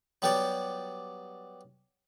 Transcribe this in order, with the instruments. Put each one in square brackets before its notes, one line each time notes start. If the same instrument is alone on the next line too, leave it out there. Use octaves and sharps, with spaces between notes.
[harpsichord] F#3 G3 B3 G4 C#5 D5